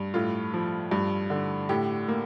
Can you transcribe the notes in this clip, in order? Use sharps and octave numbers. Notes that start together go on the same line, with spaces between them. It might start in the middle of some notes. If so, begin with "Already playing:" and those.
Already playing: G2
A2 F4
F3
G2
D3
A2 G4
A#3